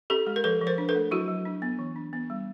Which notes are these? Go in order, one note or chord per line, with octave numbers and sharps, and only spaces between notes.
C#4 G4 A4
G#3
A#4
F3 A4 B4
F3
A#4 C5
D4
A4 B4
A3
F#3 E4 F#4
F#3
D4
B3
E3
D4
B3
G3